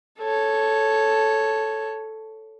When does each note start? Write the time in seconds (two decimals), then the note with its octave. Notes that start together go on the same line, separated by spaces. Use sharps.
0.19 A4 C#5